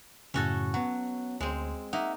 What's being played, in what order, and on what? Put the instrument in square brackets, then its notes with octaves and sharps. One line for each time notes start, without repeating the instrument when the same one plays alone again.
[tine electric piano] F#2 A2 C#3 [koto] C#4 F#4 A4
[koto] F#3 [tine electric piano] B3 F#5
[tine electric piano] D2 [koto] G#3 C4
[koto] A#3 D#4 [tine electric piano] E5 F#5